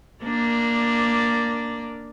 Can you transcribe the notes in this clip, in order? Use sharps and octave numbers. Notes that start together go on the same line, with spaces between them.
A#3 D4 D5